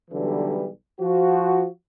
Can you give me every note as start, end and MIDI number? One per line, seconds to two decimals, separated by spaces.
0.10 0.68 35
0.10 0.68 50
0.10 0.68 52
0.10 0.68 54
0.10 0.68 55
1.01 1.66 53
1.01 1.66 66